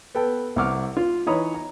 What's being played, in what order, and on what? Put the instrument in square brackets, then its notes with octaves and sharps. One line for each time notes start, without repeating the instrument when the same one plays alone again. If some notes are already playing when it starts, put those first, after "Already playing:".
[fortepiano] B3 A4 G5 A5
C2 F#5 C#6 D6 F6
F4
E3 D#4 C#5 A#5 B5 D#6
A#5